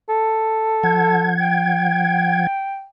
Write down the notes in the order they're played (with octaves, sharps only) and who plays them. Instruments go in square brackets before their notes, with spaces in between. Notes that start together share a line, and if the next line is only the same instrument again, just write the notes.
[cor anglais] A4
[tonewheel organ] F3 F#5 G#6
[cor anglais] G5